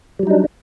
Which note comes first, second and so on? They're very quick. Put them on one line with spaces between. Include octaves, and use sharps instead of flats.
G3 F#3 D#4 D4